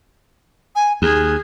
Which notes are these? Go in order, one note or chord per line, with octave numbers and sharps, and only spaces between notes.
G#5
D#2 G#4